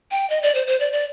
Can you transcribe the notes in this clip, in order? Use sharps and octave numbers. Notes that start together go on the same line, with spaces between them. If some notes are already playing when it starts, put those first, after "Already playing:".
G5
D#5
D5
C5
C5
D5
D5